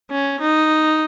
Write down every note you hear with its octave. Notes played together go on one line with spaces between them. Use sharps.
C#4
D#4